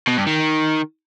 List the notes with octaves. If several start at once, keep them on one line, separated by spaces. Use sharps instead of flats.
B2
G2
D#3